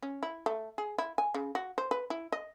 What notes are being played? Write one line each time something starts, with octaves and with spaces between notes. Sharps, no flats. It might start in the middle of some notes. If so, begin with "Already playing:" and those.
C#4
E4
A3
G#4
E4
G#5
C#3
F#4
C5
B4
E4
D#5